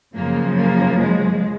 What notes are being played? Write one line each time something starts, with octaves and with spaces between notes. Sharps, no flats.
F#2 C#3 F3 A#3
A#3
G#3